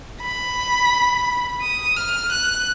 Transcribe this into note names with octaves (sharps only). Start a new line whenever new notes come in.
B5
D#6
F6
F#6